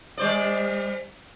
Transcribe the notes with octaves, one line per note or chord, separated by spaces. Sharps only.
G3 C5 D5